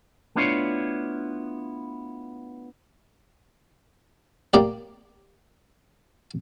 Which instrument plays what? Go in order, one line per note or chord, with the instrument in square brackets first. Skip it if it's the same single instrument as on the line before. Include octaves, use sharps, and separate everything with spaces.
[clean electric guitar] A3 B3 D4 E4 F4 C#5
[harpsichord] A#3 G4 D5